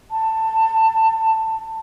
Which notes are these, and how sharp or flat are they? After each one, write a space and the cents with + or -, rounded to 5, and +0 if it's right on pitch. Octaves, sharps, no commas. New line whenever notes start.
A5 +15